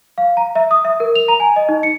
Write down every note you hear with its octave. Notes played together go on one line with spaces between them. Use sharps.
F5
A#5
E5
D#6
E5
A#4
F7
A#5
G#5
D#5
D#4
C#7